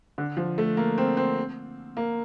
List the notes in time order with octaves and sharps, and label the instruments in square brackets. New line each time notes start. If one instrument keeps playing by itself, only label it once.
[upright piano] D3
F3
A3
A#3
C4
C4
A#3